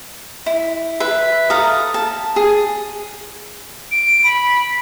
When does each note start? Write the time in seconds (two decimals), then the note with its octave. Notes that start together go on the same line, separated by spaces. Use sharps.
0.46 E4
1.00 B4 E5
1.50 A4 F5 A#5 D#6
1.94 A5
2.36 G#4
3.92 D7
4.24 B5